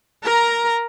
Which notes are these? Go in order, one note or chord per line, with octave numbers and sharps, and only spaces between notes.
A#4 A#5